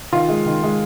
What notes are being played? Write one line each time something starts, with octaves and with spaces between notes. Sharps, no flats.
D#3 F4
G#3
D#3
G#3